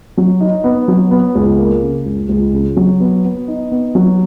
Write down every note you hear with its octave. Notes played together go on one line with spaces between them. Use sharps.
F#3
D#4
B3
F#3
B3
C#2
A#3
C#3
C#2
C#2
C#3
F#3
B3
B3
D#4
B3
F#3